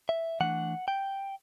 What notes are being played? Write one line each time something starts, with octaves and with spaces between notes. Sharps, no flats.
E5
E3 A3 D4 F#5
G5